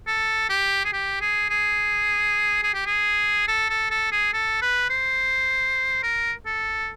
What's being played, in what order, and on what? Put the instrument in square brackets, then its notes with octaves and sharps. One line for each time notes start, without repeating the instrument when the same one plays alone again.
[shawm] A4
G4
G#4
G4
G#4
G#4
G#4
G4
G#4
A4
A4
A4
G#4
A4
B4
C5
A#4
A4